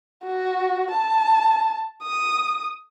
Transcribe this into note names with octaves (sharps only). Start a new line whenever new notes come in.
F#4
A5
D#6